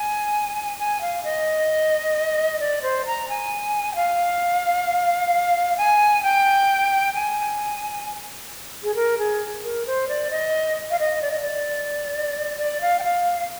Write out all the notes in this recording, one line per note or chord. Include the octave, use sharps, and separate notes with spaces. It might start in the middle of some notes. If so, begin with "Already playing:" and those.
Already playing: G#5
G#5
F5
D#5
D5
C5
A#5
G#5
G5
F5
G#5
G5
G#5
G#4
A#4
G#4
A#4
C5
D5
D#5
F5
D#5
D5
D#5
D5
D5
F5
G5
F5